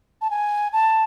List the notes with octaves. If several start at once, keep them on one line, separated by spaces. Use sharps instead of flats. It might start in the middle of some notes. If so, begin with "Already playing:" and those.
A5
G#5
A5